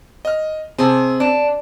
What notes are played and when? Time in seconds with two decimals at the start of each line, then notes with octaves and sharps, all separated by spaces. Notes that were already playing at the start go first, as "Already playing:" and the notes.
0.25 D#5 F6
0.78 C3 C4 G#4 A5
1.20 D4